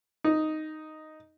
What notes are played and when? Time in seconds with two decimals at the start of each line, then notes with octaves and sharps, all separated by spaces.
0.24 D#4